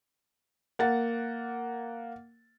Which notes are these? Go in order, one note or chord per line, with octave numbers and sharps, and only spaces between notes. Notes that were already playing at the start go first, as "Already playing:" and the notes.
A#3 F#5 A6